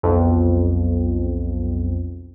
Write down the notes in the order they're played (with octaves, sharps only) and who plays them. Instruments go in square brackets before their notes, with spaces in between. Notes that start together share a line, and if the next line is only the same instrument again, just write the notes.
[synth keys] B1 F2